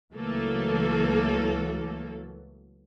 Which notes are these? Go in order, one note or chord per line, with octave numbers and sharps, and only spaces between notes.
C#2 E3 F#3 A3 A#3 A4